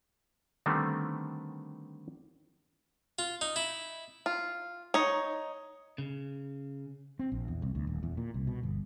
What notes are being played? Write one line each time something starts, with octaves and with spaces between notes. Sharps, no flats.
D3 D#3 G3 A3 B3 C4
F4
D#4
E4
F4
D#4 C#5
C#3
C4
A#1
E2
C2
D2
D#1
E2
A#2
C2
B2
G1